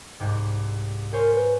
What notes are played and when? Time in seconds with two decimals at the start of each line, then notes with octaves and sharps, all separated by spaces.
0.20 C2 G#2 C3
1.13 A#4 C5 C#5 G#5
1.35 B4